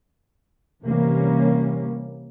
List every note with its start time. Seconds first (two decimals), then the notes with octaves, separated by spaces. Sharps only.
0.83 C3 E3 G3 A#3 C#4